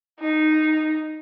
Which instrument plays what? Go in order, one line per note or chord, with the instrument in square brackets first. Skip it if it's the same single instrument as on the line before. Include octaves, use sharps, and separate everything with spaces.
[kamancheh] D#4